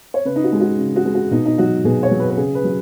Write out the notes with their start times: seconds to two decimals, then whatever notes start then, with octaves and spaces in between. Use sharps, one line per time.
0.14 C#5
0.25 C#3 B4
0.36 D#4
0.44 F#4
0.52 G#3
0.61 F#4
0.78 C#3
0.96 F#4
1.05 G#3
1.14 F#4
1.31 B2 D#4
1.45 D#4
1.58 F#3 F#4
1.85 B2 G#4
2.03 C#5
2.11 F#3
2.20 B4
2.30 B4
2.37 C#3 G#4
2.55 B4
2.64 F#3